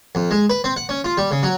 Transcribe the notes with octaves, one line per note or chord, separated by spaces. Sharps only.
F2
G#3
B4
C4
F#5
C#4
F4
G3
C#3
F#3